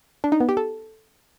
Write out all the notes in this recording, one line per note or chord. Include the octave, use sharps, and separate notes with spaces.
D4
D#4
B3
G4
A4